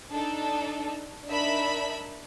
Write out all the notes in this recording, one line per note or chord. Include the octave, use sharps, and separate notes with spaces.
D4 D#4 A4
D4 D#4 A#4 E5 B5